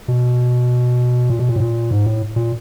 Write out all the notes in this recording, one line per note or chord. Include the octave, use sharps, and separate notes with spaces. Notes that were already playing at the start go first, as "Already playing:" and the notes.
B2
A#2
B2
A#2
A2
A#2
G#2
A2
A#2